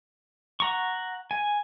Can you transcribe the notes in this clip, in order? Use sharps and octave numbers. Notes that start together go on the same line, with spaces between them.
F#5 A#5 C#6
G#5